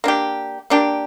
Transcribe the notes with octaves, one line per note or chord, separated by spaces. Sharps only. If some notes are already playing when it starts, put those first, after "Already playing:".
A#3 D4 G4
A#3 D4 G4